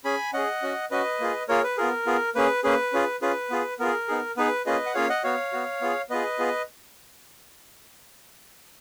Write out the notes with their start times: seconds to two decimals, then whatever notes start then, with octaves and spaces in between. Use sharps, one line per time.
0.04 C#4 G#4 G#5 B5
0.33 C#4 G#4 D#5 F#5
0.62 C#4 F#4
0.91 C#4 F#4 B4 D#5
1.20 A#3 F4 G#4
1.49 A#3 F4 G#4 A#4 C#5
1.63 B4
1.77 B3 F4 G#4 A#4
2.06 B3 F4 G#4
2.35 A#3 C#4 G#4 B4
2.64 A#3 C#4 G#4 B4
2.93 C#4 F4 G#4
3.22 C#4 F4 G#4 B4
3.50 B3 F4 G#4
3.80 B3 F4 G#4 A#4
4.08 B3 D#4 G#4
4.37 B3 D#4 G#4 B4
4.66 A#3 C#4 F4 G#4 B4 D#5
4.86 F#5
4.95 A#3 C#4 F4 G#4 C#5 F5
5.09 D#5 F#5
5.24 B3 F#4 C#5 F5
5.52 B3 F#4
5.81 B3 F4 G#4
6.10 B3 F4 G#4 B4 D#5
6.39 B3 F4 G#4